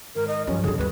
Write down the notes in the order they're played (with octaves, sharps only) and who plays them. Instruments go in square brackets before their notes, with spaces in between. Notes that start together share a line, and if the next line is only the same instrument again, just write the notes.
[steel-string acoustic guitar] G#2 D#3 [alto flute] A#4
[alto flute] D#5
[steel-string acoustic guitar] G2 F3 [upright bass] G3 [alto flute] C#4
[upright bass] D3 G3 [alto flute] G#4
[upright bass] D2 G3 [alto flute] B4